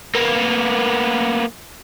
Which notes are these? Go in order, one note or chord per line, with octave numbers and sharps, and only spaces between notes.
A#3 B3